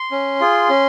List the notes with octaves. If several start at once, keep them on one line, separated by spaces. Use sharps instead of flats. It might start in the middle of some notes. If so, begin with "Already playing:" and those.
Already playing: C6
C#4
F4 G#4
C#4